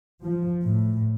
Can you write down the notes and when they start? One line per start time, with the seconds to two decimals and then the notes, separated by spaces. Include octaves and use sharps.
0.23 F3
0.64 A2